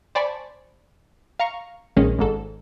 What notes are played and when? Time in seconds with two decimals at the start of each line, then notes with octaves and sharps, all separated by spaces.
0.15 C5 D5 G#5 A5 B5 C#6
1.39 F5 A#5 C#6
1.96 A#1 D#3 G#3 C#4
2.19 G#1 G#2 A4